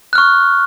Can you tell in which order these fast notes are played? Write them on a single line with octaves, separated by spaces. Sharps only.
F#6 F6 C#6